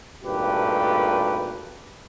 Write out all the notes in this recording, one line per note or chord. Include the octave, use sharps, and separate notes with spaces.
G#1 G2 A#2 A3 G4 B4